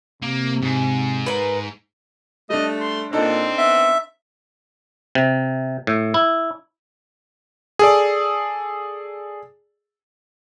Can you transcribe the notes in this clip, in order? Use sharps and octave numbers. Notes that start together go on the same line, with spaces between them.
C3 A#3
G#2
A#4 B4
G3 A3 D4 D#5
C6
A#2 C4 D4 D#4 A4
B3 E5
C3
A2
E4
G#4 A4 D5